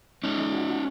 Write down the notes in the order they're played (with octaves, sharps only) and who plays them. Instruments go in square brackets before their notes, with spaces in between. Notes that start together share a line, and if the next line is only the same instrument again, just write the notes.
[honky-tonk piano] G#3 [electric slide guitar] C#4 D#4
[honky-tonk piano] G#3
F#4
F#4